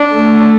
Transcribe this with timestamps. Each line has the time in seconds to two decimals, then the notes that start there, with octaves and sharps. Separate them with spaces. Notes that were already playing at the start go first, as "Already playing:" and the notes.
Already playing: D4
0.15 A3